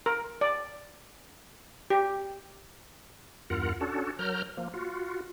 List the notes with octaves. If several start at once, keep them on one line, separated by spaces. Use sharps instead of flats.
A#4
D5
G4
E2 G2 F4 A#4 F#5
C#4 D4 F#4 A4
F#3 A#4 A#5 F6 G6
F3 A#3
F4 F#4